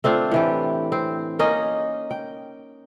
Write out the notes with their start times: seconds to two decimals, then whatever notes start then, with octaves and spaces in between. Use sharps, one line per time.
0.04 A3 C4 D4 F4
0.31 A2 E3 G4
0.92 C4
1.39 A#3 C#4 D#4 D#5
2.11 G5